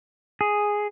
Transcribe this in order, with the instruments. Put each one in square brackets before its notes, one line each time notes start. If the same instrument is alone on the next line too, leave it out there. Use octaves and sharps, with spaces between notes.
[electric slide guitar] G#4